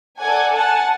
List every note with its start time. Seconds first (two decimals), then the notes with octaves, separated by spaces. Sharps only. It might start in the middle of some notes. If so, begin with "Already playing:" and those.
0.18 A4 D5 F#5 G#5
0.55 F#5 G#5 A5